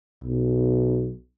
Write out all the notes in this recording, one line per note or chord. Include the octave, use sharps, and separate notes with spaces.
B1